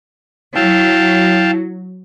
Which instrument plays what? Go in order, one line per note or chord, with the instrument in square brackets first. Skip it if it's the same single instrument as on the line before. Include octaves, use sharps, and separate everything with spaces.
[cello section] F#3 [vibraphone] E4 [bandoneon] F5 G5 A5